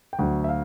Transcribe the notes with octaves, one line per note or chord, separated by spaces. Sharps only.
G5
D2 D3 F#3 F#5
E5
F5